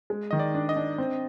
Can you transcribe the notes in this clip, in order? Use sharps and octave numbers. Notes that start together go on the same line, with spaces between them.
G#3
D#3 D#5
D5
D4
D#5
D4
C4